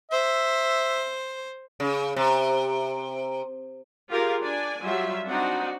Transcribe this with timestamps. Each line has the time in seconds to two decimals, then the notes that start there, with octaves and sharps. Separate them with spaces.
0.11 C5 E5
1.80 C#3
2.16 C3
4.11 F4 G4 G#4 A#4 F5
4.43 D4 D5 G#5
4.84 F#3 G3 F4 E5
5.27 C4 D4 D#4 F#4 F#5